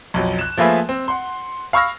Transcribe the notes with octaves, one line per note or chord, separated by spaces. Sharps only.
B1 F2 F#3
F#6 E7
F3 A3 A#3 G#4 B4 E5
C4
F#5 C6
F5 B5 C#6 E6 F6 A#6